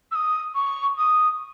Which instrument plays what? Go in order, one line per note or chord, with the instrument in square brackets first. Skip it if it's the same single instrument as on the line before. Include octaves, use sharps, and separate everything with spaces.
[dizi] E6
D#6
C#6
D#6